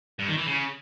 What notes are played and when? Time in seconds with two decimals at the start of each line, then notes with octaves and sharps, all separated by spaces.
0.19 G2
0.28 D#3
0.37 E3
0.47 C#3